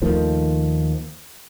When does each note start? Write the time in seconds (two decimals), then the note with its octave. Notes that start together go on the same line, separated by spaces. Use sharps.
0.02 D#2 D#3 F3 A3